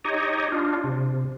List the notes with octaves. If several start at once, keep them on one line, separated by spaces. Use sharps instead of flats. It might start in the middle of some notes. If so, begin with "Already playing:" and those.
D#4 G4 C#5 D#5
D4 F4
C3